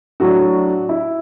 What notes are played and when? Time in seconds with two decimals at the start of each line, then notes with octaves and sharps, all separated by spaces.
0.20 A2 F#3 D4 F#4
0.89 E4